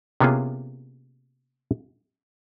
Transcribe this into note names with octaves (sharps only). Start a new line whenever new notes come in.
C3 A#3 B3 C#4 F4 G#4